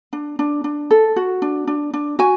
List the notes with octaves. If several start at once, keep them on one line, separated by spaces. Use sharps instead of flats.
D4
D4
D4
A4
F#4
D4
D4
D4
F#4 G#5